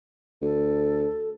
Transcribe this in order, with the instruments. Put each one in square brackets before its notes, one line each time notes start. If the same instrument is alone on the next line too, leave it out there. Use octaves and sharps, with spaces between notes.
[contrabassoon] D2 [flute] A4